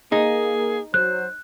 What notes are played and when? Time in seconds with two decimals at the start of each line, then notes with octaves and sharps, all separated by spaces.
0.12 A#3 D#4 G#4
0.94 F#3 C5 F#6